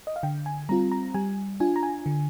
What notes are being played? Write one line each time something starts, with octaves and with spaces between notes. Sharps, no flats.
D#5
F5
D3 G5
G#5
G3 C4 F4 A#5
A#5
G3 G#5
D4 F4 G#5
A#5
G#5
D3